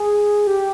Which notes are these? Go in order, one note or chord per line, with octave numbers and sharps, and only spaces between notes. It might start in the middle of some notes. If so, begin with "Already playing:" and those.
Already playing: G#4
G4